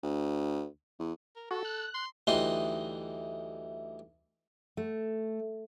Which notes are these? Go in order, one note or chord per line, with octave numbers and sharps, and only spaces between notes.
D2
E2
A#4
F#4 A4
F#6
C6
D2 E3 G3 D#4 D#5 C6
A3